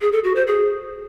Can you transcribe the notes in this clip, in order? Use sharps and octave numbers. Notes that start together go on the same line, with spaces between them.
G#4
A4
F#4
C5
G#4